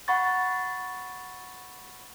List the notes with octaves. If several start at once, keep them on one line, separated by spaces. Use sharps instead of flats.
F#5 B5 C#6 A6